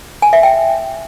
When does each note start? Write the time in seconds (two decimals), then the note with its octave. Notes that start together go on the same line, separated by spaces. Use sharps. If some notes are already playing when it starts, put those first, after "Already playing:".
0.22 G#5
0.33 E5
0.43 G5